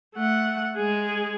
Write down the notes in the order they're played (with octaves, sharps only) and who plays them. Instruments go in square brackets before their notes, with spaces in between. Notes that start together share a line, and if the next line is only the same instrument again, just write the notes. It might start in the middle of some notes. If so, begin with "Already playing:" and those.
[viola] A3 F#5
G#3 G#4